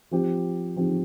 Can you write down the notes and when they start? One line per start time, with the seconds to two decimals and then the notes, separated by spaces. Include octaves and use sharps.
0.11 F3 C4 G4
0.77 F3 C4 G4